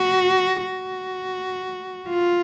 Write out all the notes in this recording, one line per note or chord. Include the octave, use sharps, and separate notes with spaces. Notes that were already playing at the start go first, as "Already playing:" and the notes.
Already playing: F#4
F#4
F4